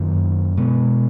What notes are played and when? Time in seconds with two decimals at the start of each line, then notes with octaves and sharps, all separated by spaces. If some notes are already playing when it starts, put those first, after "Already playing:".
Already playing: F#2 D#3 A#3
0.57 B2 G#3 B3